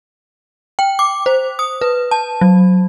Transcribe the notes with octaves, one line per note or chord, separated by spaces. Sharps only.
G5
D6
C5
D#6
B4
A5
F#3